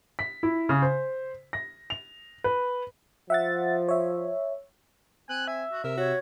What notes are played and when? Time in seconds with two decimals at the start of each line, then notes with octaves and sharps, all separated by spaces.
0.19 B6
0.43 E4
0.69 C#3
0.82 C5
1.53 A#6
1.90 F7
2.44 B4
3.30 F3 E5 F#5 A6
3.89 C#5 E5
5.29 C4 G#5 F#6
5.48 E5 G#5
5.72 F#4
5.84 C3 A#4 E5
5.98 F#4 C#5